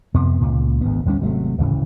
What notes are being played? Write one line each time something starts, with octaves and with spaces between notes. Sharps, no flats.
F2 C3 B3
C#2 A#2 C#3
G#1 D2 B3
D2 G3 C#4
G#1 C3 F#3 A3
D1 G#1 C#3 E3